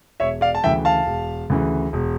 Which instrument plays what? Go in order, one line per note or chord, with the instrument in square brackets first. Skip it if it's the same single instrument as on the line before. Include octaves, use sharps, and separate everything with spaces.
[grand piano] E1 C#5 E5
D5 F5
A5
D2 C#3 E3 E5 G5
F5 A5
E1
D2 C#3 E3
E1